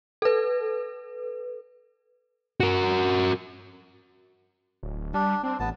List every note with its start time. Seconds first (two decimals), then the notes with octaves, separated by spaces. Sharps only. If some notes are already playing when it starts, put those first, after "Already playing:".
0.22 A4 B4
2.60 F#4 A#4
4.83 D1
5.14 G3 D4
5.43 C4 D4
5.60 A1 B3 A5